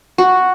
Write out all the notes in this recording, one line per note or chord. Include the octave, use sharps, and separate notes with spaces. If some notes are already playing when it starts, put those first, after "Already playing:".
F#4